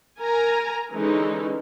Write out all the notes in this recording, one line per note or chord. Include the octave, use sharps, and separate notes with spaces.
A#4 G#5 A#5
D3 E3 G#3 C#4 D#4